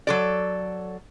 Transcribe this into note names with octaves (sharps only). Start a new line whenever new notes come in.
F#3 A4 D5